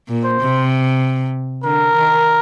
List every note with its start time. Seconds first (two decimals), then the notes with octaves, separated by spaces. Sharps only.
0.09 A#2
0.24 C5
0.40 C3
1.64 D3 A#4
1.95 D#3